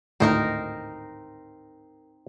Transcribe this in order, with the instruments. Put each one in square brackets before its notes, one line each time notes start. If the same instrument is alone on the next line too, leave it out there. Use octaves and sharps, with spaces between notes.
[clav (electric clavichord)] G#1 D2 A2 [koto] C4 D#4 A#4